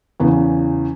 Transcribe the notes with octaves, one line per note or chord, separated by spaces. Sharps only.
E2 C#3 E3 B3